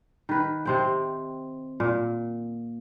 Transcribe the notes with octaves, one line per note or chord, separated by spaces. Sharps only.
D#3 B4
C3 C4 G5
A#2